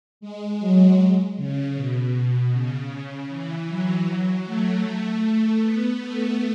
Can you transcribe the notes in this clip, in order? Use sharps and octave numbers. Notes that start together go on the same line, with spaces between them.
G#3
F#3
C#3
B2
C#3
E3
F#3
F#3
A3
A3
B3
A3